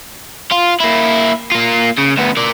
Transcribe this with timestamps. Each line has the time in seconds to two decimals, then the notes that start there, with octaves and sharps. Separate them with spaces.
0.52 F4
0.81 A#3 E4
1.52 A#3 F4
1.98 C#3
2.17 D2 B3
2.37 A#4 D5